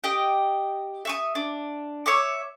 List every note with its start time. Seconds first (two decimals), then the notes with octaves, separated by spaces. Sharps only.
0.04 G4 D#5 G5
1.05 E5 C#6 D#6
1.35 D4
2.06 C#5 E5 C#6 D6